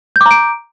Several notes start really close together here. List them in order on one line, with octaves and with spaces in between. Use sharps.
G6 D6 A#5 D7